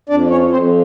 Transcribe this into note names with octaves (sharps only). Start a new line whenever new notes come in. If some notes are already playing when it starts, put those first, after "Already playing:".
F2 D4 D5
C#4 C#5
F2 C4 C5